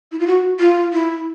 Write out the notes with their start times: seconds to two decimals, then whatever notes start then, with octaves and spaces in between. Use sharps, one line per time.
0.12 E4
0.19 F4
0.27 F#4
0.60 F4
0.93 E4